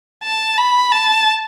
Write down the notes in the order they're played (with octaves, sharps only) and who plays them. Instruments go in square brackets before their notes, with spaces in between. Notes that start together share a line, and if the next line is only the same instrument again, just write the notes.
[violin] A5
B5
A5